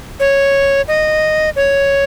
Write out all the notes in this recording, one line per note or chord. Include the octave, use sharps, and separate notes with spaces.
C#5
D#5
C#5